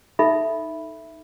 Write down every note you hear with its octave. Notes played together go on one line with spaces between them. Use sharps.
D#4 A4 E5 B5